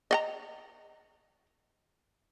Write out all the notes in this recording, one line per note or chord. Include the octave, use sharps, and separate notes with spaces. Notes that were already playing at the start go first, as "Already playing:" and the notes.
D#5 F#5 A#5